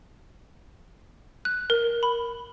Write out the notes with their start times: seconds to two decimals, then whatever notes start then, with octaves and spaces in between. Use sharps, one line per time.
1.45 F#6
1.70 A#4
2.03 B5